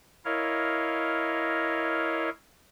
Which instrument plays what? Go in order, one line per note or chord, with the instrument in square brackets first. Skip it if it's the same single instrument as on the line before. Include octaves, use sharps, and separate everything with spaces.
[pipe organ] E4 A#4 C#5 D#5 F5